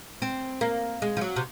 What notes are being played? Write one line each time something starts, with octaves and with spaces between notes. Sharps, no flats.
C4
A#3
G#3
F3
F#3
C3